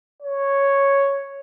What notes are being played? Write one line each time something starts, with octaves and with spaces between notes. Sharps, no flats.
C#5